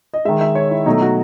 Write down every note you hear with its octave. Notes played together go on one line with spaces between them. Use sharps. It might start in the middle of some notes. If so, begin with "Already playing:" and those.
D#5
D#3 G#3 E5
E5
C#5
E4
B2 F#3 A3 D#4
F#4